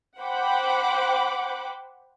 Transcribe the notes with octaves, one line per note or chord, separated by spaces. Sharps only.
C5 F#5 G5 B5 D6